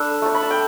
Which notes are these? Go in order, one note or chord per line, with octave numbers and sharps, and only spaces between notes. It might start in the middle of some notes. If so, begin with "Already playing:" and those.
Already playing: D4 A4 B4
A3 C#6
B5
A5
G5